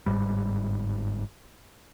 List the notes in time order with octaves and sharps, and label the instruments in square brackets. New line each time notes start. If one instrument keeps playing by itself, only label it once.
[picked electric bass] G1 G#2 G3